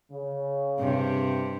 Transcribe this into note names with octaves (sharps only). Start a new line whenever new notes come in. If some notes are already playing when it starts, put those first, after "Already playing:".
C#3
G2 C3